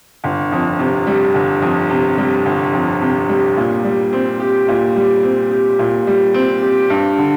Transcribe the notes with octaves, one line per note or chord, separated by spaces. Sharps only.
G1
F2
C3
G3
G1
F2
C3
G3
G1
F2
C3
G3
A#2
G3
C4
G4
A#2
G3
C4
G4
A#2
G3
C4
G4
G2
D3